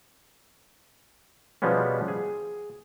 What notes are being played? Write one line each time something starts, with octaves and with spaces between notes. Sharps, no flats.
B2 F3 G3 G#3 B3 C#4
G#4